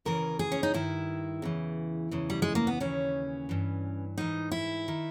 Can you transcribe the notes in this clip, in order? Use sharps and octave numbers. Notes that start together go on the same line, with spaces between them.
D#2 C#3 E3 A#4
G#4
C#4
D#4
G2 D#3 E4
E2 C#3 E3
E2 C#3 E3
G3
G#3
A#3
B3
D#2 C#3 E3 C#4
G2 E3
G#2 E3 D#4
E4
D#3